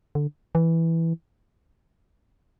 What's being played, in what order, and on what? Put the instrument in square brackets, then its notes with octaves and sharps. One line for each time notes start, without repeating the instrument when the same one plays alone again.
[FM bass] D3
E3